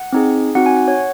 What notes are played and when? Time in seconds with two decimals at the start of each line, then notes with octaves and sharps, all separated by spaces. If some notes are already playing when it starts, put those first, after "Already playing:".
Already playing: F#5
0.13 C4 D#4 G#4
0.55 C4 D#4 F#4 F#5
0.66 G#5
0.77 F#5
0.88 C#5